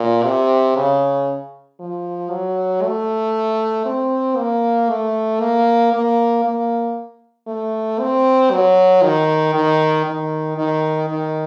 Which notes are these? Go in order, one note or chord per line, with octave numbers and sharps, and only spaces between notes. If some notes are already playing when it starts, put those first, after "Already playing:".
Already playing: A#2
C3
C#3
F3
F#3
A3
C4
A#3
A3
A#3
A#3
A#3
A3
C4
F#3
D#3
D#3
D#3
D#3
D#3